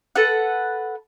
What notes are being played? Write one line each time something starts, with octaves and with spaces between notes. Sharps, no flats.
A4 B4 F#5